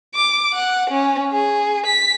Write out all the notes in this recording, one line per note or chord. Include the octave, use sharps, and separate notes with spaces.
D6
F#5
C#4
G#4
B6